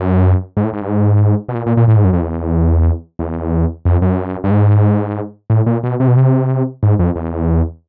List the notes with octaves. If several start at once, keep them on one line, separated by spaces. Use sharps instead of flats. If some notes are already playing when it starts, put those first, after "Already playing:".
Already playing: F#2
G#2
A2
G#2
G2
G#2
B2
A#2
A#2
A#2
A2
G#2
F#2
F2
E2
E2
F2
F#2
G2
G#2
A2
A#2
B2
C3
B2
C3
G#2
F2
E2